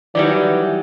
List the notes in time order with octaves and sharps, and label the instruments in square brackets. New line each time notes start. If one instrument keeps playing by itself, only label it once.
[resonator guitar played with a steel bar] D#3 F#3 G3 [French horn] E3 [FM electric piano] D5